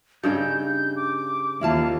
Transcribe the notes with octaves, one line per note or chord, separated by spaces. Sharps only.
G2 C#3 D#4 A4 D5 G6
G6
D6
D#2 E4 F4 F5 A5